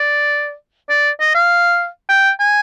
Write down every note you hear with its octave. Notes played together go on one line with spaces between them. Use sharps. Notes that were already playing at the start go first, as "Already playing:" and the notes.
Already playing: D5
D5
D#5
F5
G5
G#5